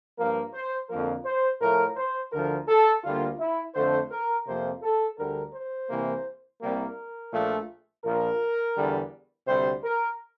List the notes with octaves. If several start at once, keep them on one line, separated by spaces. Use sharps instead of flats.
G2 F3 A#3 A#4
C5
F2 D3 F3 A#3 A#4
C5
A2 F3 A3 A#4
C5
D2 D3 F3 A#4
A4
D2 D3 G3 A#3 F4
E4
F2 D3 A3 C5
A#4
F2 C3 F3 A#3 C5
A4
D2 D3 G3 A#4
C5
C2 C3 E3 A#3
C2 C3 G3 A#3 A#4
A#1 A#2 F3 A3
A#1 A#2 F3 A#4
E2 D3 G3
D2 C3 G3 C5
A#4